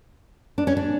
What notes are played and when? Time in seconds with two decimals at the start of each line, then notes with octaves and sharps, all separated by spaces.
0.58 D4
0.67 C#4
0.77 D4